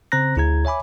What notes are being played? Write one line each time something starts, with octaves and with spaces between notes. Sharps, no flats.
C#3 C4 C5 A#5 F#6 A#6
D2 E4 G#4 A#5 G#6
C#5 E5 G#5 B5 D6